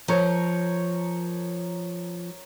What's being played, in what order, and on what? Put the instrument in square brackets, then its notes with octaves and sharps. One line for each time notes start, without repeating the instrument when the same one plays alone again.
[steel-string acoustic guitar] F3 [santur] A#4 C#5